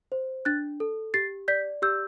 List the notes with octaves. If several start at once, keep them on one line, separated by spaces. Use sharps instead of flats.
C5
D4 F#6 A6
A4
G4 A6 C7
D5 G6 B6
G4 E6 G6